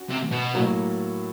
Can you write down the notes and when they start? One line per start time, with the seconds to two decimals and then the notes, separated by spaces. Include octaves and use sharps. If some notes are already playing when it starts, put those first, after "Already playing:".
Already playing: C#4 F#4
0.10 C3
0.32 B2
0.54 A2 F#3 A#3